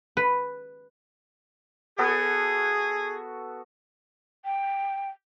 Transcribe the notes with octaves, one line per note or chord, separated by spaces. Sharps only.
B4
B3 F#4 G#4 A4
G5